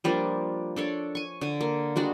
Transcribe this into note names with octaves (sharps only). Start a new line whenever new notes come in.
F3 G3 A#3 D4
D4 A4 C#5 D5
G#5 C#6
D3 G#5
A#3
G3 G#3 D4 F#4